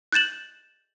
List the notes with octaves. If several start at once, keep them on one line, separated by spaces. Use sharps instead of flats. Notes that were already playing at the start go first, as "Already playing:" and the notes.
F#6 G6 A6 E7 F#7